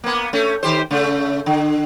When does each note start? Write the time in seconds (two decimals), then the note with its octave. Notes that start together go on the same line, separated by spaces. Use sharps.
0.04 A#3 B3
0.33 A3 C#4
0.63 D#3 G4 C5
0.91 C#3 A3
1.46 D3